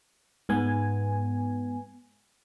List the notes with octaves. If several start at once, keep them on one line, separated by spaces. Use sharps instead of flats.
G#2 B3 G#5